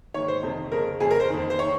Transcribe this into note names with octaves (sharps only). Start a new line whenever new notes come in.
G#2 D#3 C#5
C5
F2 C3 D#3
F2 C#3 A#4
F2 C#3 G#4
A#4
C5
F2 D#3
C5
D#3 C#5